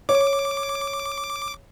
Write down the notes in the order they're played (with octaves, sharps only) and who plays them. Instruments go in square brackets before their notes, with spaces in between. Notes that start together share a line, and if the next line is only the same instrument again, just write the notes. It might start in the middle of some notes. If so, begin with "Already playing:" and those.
[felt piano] C#5 [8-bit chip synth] D6